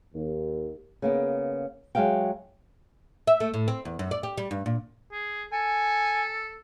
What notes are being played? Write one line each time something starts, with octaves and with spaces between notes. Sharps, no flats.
D#2
C#3 A#3 B3
F#3 G#3 E5 F5 G5
E5
A3
A2
C4
E2
F#2
D5
G4
G3
G2
A#2
G#4
A4 G#5